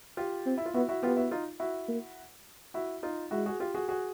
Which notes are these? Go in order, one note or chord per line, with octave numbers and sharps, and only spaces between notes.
F4 G4
C4
E4
F4
B3 E4 F#4
E4 F#4
B3 F4 G4
E4 F#4
D#4 F4
E4 F#4
A#3
E4 F#4
D#4 F4
G#3 E4 F#4
F#4 G#4
F4 G4
F#4 G#4
F#4 G#4